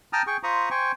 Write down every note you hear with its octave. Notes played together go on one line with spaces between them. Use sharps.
G5 A5 A#5 D#6 F6
G#4 G5 C#6
F4 C5 A#5 B5 C#6 D#6
C5 G5 G#5 C#6